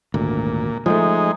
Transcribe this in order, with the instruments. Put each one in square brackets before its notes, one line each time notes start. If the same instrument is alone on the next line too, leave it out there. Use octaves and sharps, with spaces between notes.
[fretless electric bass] G#1 D2 [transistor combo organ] A#2
[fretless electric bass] F3 F#3 A3 [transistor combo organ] G#3 D#4